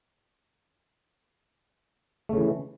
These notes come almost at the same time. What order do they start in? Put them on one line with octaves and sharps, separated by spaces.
A3 C#3 E3